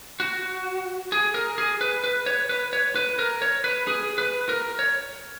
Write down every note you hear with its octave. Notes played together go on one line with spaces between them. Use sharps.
F#4
G#4
A#4
G#4
B4
B4
C#5
B4
C#5
B4
A#4
C#5
B4
G#4
B4
A#4
C#5